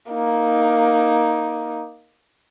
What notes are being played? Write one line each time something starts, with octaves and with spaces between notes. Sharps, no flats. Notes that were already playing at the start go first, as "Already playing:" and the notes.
A#3 D#4